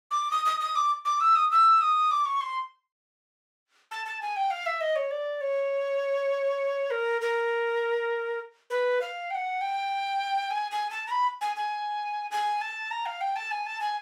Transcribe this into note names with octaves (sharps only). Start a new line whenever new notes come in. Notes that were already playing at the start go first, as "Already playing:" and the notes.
D6
D#6
D#6
D#6
D6
D6
E6
D#6
E6
D#6
D6
C#6
C6
A5
A5
G#5
G5
F5
E5
D#5
C#5
D5
C#5
A#4
A#4
B4
F5
G5
F#5
G5
G#5
G#5
A5
A#5
B5
G#5
G#5
G#5
A5
A#5
F5
G5
A5
G#5
A5
G#5